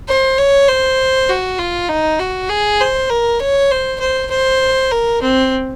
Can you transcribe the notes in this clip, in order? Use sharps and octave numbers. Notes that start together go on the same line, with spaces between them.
C5
C#5
C5
F#4
F4
D#4
F#4
G#4
C5
A#4
C#5
C5
C5
C5
A#4
C4